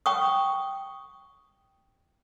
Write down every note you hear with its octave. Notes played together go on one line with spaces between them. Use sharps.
G5 C#6 D#6